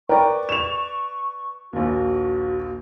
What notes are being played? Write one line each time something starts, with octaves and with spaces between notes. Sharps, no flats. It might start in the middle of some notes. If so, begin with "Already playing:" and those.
A#4 B4 D5 G5 C#6
E7 F7
A#1 D#2 F#4